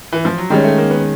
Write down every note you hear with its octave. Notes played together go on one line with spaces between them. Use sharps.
E3
F3
F#3
D#3 G3 G#3 C#4
A3
A#3
B3